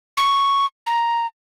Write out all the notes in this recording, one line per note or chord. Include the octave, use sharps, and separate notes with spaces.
C#6
A#5